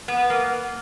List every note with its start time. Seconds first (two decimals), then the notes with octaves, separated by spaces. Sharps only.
0.08 B3
0.30 A#3